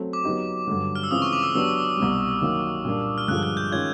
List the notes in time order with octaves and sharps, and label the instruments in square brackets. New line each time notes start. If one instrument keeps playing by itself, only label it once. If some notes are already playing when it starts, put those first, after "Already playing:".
Already playing: [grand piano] F#3 A3 C4
[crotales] D6
[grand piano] F#3 B3 D#4 G4
G2 D3 F#3
[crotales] F6
E6
[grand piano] C#3 E3 G#3 C4 F4 [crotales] D#6
[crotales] C#6
D6
E6
[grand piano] F#3 B3 D4 G4 [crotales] E6
[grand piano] C2 B2 G3
D#3 F#3 A#3
A#2 G3 A#3 D4
[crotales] F6
[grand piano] G2 D3 F3 G#3 [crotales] F#6
[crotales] F#6
G6
[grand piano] D#3 G#3 C#4 F4 [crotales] G#6